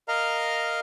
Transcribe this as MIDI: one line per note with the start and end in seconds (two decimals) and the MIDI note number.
0.08 0.80 70
0.08 0.80 75
0.08 0.80 77
0.08 0.80 82
0.08 0.80 89